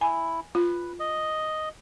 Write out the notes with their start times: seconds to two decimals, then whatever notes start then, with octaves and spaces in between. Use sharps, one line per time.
0.01 E4 G#5
0.55 F4 B4
1.00 D#5